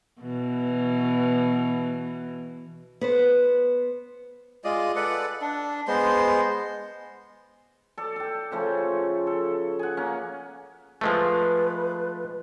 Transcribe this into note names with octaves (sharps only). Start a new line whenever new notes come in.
B2 E3
B3 B4 C5
G#3 F4 D5 D#5
A4 B4 D5 F#5
D4
G#3 B3 C5 C6
A4 D5
A4 G5
C#3 F3 A3
A4
G#4 F#5
A#3 C#4
F3 G#3 A3 B4